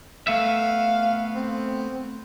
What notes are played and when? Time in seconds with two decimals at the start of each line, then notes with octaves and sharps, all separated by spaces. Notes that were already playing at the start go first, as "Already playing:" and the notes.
0.27 A3 B3 E5 F5
1.35 C4